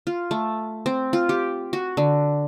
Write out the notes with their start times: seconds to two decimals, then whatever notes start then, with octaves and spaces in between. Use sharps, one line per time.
0.07 F4
0.31 A3
0.86 C4
1.13 F4
1.29 G4
1.73 F#4
1.97 D3